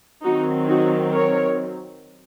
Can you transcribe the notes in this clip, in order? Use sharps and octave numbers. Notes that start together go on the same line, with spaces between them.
D#3 F#3 C4 D#4 F#4
D#4 F#4
A#4 C#5